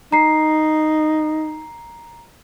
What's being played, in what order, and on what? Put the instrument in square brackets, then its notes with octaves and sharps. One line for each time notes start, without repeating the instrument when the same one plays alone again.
[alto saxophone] D#4 [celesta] A#5 C7